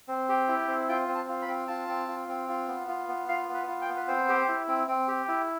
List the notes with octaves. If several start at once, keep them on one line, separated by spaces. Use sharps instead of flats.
C4
G4
E4
C4
F4 G5
C4
A5
F4
B5
C4
F4 A5
C4
F4
C4
F4
B3
F4
B3
F4 F5
B3
B4
F4
G5
B3
B4
C4 C5
G4
E4
C4
C4
G4
E4